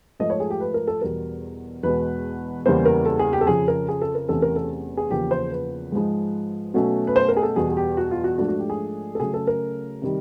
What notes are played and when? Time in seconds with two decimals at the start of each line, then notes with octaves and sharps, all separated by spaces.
0.20 G#2 F3 A3 D#5
0.30 C#5
0.40 G#4
0.50 G4
0.60 B4
0.74 A#4
0.88 A4
1.01 E2 B2 G3 A#4
1.83 E2 B2 G#3 B4
2.66 E2 C#3 E3 G3 A#3 C5
2.86 A#4
3.06 A4
3.19 G#4
3.33 G4
3.41 A4
3.47 F2 C#3 F3 G#4
3.68 A#4
3.88 G#4
4.02 A4
4.15 A#4
4.29 E2 C3 E3 A3 C#4 A4
4.42 A#4
4.56 A4
4.97 G#4
5.11 E2 C#3 F3 A#3 G4
5.31 C5
5.52 B4
5.92 G#2 F3 G#3
6.74 B2 F#3 A3 C#4
7.07 B4
7.16 C5
7.29 A#4
7.37 G#4
7.43 A4
7.56 E2 B2 G3 G#4
7.71 G#4
7.77 G4
7.97 F#4
8.11 F4
8.24 F#4
8.38 G#2 F3 A3 D4 F#4
8.48 F#4
8.59 G4
8.70 G#4
9.15 A4
9.20 C#3 F#3 A3 C#4 G#4
9.34 A4
9.47 A#4
10.02 C3 D#3 G3